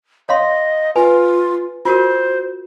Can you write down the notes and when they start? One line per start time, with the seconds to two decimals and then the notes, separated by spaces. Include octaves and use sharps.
0.29 C#5 D#5 F5 C6
0.96 F4 B4 G#5
1.85 F4 F#4 A#4 C5